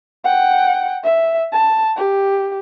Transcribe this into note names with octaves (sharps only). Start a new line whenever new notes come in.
F#5 G5
E5
A5
G4